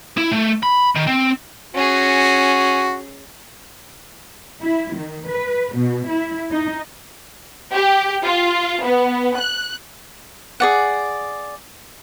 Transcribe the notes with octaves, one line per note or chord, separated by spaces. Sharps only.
E4
A3
B5
D#3
C4
C#4 F#4 G#4
E4
D#3
B4
B2
E4
D#4
G4
F4
B3
F#6
G#4 D5 F#5